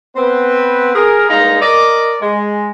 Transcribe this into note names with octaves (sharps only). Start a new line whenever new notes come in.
B3 C4 B4
G#4 A#4
G2 A#2 G#3 D#4 F5 A#5
A#4 D5 D#5
G#3